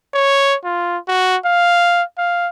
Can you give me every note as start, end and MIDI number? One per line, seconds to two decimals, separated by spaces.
0.14 0.55 73
0.64 0.98 65
1.08 1.37 66
1.45 2.03 77
2.18 2.49 77